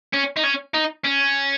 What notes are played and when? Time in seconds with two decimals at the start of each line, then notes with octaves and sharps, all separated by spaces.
0.14 C#4
0.37 D#4
0.44 C#4
0.74 D#4
1.05 C#4